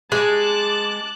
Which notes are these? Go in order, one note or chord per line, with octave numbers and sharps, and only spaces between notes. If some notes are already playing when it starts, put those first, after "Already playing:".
G#3 A5 D6 F#6